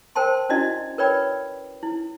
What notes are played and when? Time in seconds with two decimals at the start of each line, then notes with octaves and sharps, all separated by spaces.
0.16 A#4 C5 G5 A5 C6
0.49 C#4 D4 E4 F#4 D5 D#5
0.98 A#4 B4 C#5 D5 G5 B5
1.83 E4